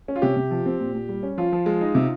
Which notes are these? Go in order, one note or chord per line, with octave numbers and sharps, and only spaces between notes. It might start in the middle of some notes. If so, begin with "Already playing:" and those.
C#4
F4
C3 G4
C3
F3
C4
A#2
A#2
G3
C#4
F3 F4
F3
G#3
D#4
C3